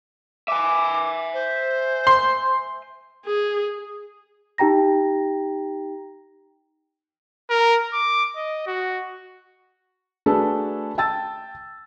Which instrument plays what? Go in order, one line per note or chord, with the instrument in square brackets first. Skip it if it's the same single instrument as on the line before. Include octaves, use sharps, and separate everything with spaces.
[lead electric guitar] E5 G#5 [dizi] D6
[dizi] C5
[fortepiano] C6
[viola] G#4
[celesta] D#4 G4 G5 A#5 A#6
[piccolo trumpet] A#4
D6
D#5
F#4
[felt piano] A3 D4 F#4 G#4 A4 B4
G5 A5 E6 A6